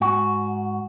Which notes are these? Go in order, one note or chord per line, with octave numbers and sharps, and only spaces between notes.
G#2 F#4